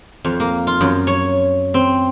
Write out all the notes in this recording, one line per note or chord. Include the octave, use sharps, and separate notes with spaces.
F2
A#3
F4
F#2
C#5
C4